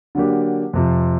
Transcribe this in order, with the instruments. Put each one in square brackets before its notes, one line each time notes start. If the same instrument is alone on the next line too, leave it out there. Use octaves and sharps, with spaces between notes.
[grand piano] D3 F#3 A#3 D4 G4
F2 C3 F3